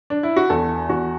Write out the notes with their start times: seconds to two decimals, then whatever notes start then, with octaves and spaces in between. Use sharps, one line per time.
0.10 D4
0.23 E4
0.36 F#4
0.50 E2 A4
0.89 E2 F#4